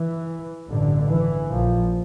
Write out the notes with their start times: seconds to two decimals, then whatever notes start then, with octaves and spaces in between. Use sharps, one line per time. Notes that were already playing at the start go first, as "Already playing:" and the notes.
Already playing: E3
0.69 A1 G2 D3
1.09 E3
1.49 A#1 A#2 F3